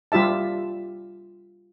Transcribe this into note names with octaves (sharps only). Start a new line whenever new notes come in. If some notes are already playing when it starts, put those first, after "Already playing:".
G3 F4 G4 E5 A5